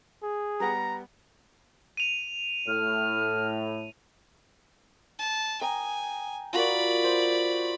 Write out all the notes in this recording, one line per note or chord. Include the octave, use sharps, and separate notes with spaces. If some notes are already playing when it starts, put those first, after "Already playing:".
G#4
G3 B3 F#5 A#5
D#7 F7
A2 F6
A5
G5 G#5 A#5 D#6
F4 F#4 A#4 D5 B5
C5 D#6